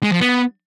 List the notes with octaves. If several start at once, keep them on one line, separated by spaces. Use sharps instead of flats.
G#3
F3
B3